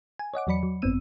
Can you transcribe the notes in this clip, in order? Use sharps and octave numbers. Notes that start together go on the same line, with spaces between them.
G#5
C#5 D#5 F#5 D6
E2 F#3 D5 B5 C#7
F#3
G#1 F#2 B3 C4 E6 D#7